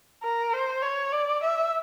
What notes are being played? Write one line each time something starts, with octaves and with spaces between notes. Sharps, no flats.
A#4
C5
C#5
D5
E5